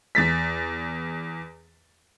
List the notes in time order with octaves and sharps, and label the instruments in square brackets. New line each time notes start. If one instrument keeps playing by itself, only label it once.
[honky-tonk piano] E2 A6 B6